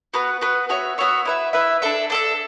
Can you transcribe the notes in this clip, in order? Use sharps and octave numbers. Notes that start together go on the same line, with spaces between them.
B3 F#4 B4
B3 F#4 B4
B3 F#4 C#5 E5
B3 F#4 C#5 E5
E4 B4 E5
E4 B4 E5
D4 A4 E5
D4 A4 E5